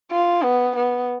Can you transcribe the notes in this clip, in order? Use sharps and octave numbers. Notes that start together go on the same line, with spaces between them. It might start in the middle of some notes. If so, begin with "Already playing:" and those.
F4
B3
B3